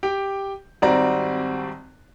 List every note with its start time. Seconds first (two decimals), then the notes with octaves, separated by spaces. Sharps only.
0.03 G4 G5
0.82 G#1 G3 C4 F#4 D5 A#5